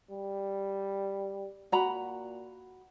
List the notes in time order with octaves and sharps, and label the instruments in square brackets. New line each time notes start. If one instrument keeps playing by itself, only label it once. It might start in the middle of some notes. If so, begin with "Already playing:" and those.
[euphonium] G3
[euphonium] A#2 [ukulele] F#4 A#5 B5